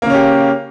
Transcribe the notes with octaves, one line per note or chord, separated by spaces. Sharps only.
C#3 A#3 C#4 G4